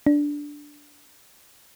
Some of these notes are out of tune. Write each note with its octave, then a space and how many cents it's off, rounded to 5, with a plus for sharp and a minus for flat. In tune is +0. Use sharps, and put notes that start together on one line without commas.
D4 -5